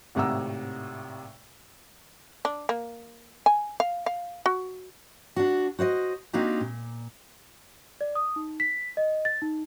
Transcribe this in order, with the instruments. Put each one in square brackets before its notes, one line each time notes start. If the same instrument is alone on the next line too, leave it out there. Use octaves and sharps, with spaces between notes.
[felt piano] G#1 A2 C3 F#5 A#5 E6
[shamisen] D4
A#3
G#5
F5
F5
F#4
[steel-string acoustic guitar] D4 F#4
F#4 C5 D5 D#5
A#3 C4 D4 D#4 F#4 G4
A#2
[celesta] D5
D#6
D#4
B6
D#5
A6
D#4